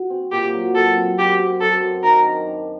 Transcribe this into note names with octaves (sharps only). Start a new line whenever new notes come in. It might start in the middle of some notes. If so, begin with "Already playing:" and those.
Already playing: F#4
C4
A#2 G4
F#3
F#3 A4
C4
F#2 G4
C4
F#2 A4
F#2
D#3 A#4
D4
D4